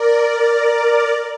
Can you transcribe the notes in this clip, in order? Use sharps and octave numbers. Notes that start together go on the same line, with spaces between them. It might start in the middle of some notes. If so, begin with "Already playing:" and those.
Already playing: A#4 D5